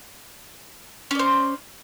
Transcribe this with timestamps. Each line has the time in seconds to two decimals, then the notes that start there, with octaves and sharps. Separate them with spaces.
1.11 C#4
1.15 D5
1.19 C5